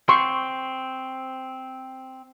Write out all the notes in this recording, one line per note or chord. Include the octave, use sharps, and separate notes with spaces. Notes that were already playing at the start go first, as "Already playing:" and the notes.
C4 C6 C#6